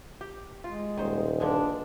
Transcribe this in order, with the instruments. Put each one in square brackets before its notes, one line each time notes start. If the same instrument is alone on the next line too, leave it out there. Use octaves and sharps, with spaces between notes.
[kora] G4
[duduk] G#3 [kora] F4
[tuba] D#1 [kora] D#3 C5
[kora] G2 D3 G#3 [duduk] D4